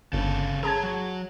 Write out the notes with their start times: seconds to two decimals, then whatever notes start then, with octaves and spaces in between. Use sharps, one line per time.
0.13 G1 C#3 A4
0.63 G#4 C#5 A5 A#5 G#6
0.83 F#3